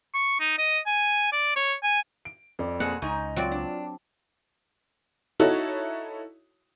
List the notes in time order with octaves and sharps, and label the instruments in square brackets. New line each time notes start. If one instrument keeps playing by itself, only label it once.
[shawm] C#6
D#4
D#5
G#5
D5
C#5
G#5
[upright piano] D7
F2 D5
[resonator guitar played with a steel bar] B2 C4 G#4 [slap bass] A#3 [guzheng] F#5
[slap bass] C#2 [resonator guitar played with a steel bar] G#2 D#4 [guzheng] G#5 [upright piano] C#6
[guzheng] F#3 C4 D5 [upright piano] F4
[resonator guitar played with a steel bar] D4
[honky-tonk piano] D#4 E4 F#4 A4 C#5